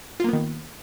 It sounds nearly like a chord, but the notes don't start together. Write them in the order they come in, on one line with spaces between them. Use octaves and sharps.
F4 A#3 B3 D#3